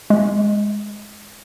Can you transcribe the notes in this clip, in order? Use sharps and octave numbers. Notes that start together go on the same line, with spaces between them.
G#3